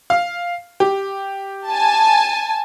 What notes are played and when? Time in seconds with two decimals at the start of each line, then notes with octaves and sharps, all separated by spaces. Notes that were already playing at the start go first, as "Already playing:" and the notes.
0.10 F5
0.80 G4
1.69 G#5 A5